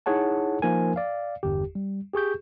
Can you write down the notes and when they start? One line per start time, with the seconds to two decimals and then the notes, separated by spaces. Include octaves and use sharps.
0.06 D#4 E4 G#4 C#5 F#5 A5
0.62 F3 A#3 D#4 A#4 G#5
0.96 D5 F5
1.43 G1 E2 G4
1.75 G3
2.13 G4 G#4 C#6 G6